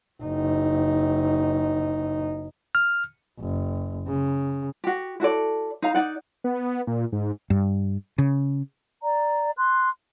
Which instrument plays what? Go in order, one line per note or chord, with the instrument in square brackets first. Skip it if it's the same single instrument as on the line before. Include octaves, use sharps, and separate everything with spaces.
[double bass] F#1 D#4
[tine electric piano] F6
[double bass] F#1
C#3
[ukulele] F#4 G4
E4 F#4 A4 D5
D#4 F5 A#5
D#4 D5 F#5
[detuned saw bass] B3
A#2
G#2
[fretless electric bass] G2
C#3
[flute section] D5 A#5
C6 F#6